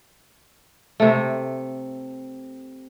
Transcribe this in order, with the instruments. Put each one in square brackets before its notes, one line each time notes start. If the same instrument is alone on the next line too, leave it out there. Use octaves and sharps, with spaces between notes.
[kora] C3 A3